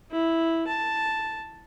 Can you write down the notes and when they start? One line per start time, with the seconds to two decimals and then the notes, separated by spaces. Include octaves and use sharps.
0.11 E4
0.67 A5